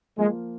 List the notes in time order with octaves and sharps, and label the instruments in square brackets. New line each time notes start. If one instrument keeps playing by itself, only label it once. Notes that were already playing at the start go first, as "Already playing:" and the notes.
[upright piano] F3 A#3 F4 [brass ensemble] G#3